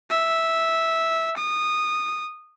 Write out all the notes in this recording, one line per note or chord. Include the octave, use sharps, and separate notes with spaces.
E5
D#6